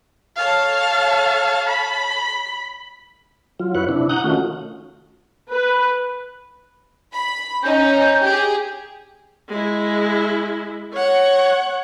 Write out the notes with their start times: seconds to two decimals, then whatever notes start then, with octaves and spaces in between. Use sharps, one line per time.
0.37 A4 C#5 F5 A5
1.69 B5
3.60 F#3 F4
3.75 F#2 E4 B4 C#5 F#6
3.89 C3 D4 E4
4.09 F#5 A#5 D#6 F#6 G6
4.24 D#3 A3 C#4 F4 F#4
5.49 B4
7.13 B5
7.64 C#4 D#4 G6
8.25 G4 G#4
9.49 G#3 E4
10.93 C#5 F#5